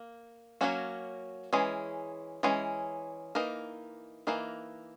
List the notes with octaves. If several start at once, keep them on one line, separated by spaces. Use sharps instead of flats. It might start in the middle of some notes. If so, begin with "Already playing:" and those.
Already playing: A#3
F#3 A#3 C#4 F#4
E3 G#3 C#4 G#4
E3 G#3 C#4 G#4
E3 A#3 D#4 A#4
E3 A#3 D#4 A#4